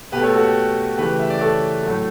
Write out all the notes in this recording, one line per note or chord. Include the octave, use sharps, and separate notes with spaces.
B2 A3 G4 B4
A4 C#5
F#4 A4
G4
C#3 E3 A3 G4 B4
E5
D5
A4 C#5
A2 F#3 A3